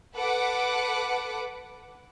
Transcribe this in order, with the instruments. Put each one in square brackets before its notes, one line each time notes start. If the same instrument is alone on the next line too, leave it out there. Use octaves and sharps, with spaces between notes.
[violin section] A4 B4 F#5 D6